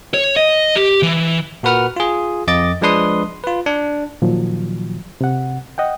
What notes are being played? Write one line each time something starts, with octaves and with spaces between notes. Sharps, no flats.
C#5
D#5
G4
E3
A#2 F#4 A#4 B4 F#5 F6
F4 G#4
F2 D#5 D6 A6
F3 G#3 D4 B4 C6 D#6
F4 B4
D4
A#2 D#3 F3 F#3
C3 F#5
D#5 F#5 G5